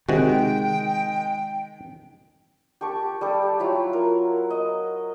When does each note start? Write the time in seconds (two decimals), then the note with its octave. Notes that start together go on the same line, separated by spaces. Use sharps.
0.09 C3 D#3 G#3 F#4 G5
2.81 G4 A5 C#6 D6
3.21 G3 G4 A4
3.59 F#3 E4 F4
3.93 A#4
4.50 D#5